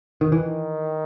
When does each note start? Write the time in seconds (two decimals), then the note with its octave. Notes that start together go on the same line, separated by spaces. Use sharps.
0.21 D#3
0.32 D#3 E3